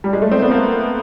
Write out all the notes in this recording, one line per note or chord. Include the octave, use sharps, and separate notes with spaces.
G3
G#3
A3
C4
B3
A#3